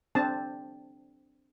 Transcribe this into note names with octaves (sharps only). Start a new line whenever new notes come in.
C4 D4 A5